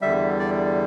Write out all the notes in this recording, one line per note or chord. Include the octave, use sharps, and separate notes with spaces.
E2 D3 G3 E5
D5